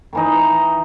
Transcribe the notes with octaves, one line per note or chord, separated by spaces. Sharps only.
D#3 E3 D#4